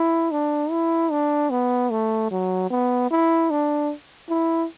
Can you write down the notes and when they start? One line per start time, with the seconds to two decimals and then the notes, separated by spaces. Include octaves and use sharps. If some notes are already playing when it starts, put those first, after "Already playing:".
Already playing: E4
0.32 D4
0.71 E4
1.11 D4
1.51 B3
1.90 A3
2.31 F#3
2.71 B3
3.11 E4
3.51 D4
4.30 E4